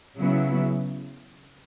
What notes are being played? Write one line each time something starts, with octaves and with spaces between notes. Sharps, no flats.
C#3 F#3 B3 E4